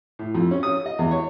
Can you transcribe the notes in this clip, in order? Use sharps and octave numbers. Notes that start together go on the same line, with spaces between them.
A2
F2
C#4
D#6
D#5
E2
C#5